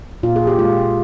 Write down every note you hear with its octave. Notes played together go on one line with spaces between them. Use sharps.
A#2 F4
G#4
G4
G#3 F4